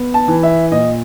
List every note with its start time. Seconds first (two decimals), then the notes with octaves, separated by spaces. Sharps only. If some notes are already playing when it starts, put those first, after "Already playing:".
Already playing: B3
0.14 A5
0.28 E3
0.43 E5
0.72 A#2 D#5